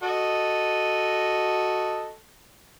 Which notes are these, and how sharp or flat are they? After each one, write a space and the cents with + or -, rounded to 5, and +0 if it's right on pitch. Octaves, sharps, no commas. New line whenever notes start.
F#4 +0 A4 +0 D#5 -5